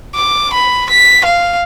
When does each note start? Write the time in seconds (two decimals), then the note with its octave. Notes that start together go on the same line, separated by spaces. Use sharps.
0.15 D6
0.53 B5
0.90 B6
1.25 F5